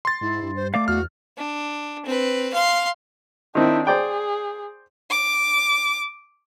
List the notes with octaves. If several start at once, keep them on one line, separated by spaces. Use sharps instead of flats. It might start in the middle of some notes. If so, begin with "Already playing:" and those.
C6 A6
G#2 E4
G2
C5
A3 D5 F5 D6
E2 F#4 F6
D4
C4 B4
F5 C6
D#3 C4 D4 E4
G#4 C5 D5 G5
D6